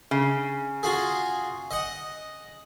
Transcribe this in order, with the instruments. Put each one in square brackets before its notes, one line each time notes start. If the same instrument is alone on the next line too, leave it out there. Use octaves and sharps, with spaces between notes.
[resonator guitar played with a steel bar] C#3
[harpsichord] F4 F#4 G#4
D#5 F#5